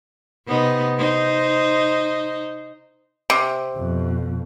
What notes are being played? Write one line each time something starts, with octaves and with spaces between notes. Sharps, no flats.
C3 B3 D#4
D#4 C5
C3
F2 B2